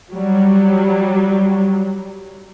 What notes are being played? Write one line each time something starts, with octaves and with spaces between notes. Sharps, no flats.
F#3 G3